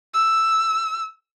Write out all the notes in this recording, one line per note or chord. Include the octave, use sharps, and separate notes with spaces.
E6